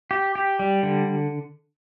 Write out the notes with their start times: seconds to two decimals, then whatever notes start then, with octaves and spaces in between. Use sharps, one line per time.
0.11 G4
0.35 G4
0.59 G3
0.83 D3